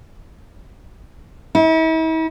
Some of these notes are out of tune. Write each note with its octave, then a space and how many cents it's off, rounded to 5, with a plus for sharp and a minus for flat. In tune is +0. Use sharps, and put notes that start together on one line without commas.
E4 -45